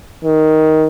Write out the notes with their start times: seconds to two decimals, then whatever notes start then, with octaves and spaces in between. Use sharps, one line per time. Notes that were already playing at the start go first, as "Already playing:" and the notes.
0.24 D#3